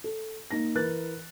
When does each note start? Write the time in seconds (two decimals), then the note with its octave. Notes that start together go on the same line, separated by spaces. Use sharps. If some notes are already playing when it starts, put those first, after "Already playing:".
0.04 A4
0.51 A#3 D#4 A#6
0.75 E3 A#4 B4 F#6 A6